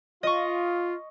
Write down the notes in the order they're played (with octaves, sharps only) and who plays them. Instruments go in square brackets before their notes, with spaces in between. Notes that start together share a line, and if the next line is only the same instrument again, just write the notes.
[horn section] F4 [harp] D#5 C#6